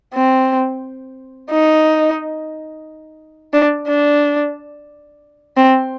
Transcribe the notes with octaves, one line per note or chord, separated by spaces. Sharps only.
C4
D#4
D4
D4
C4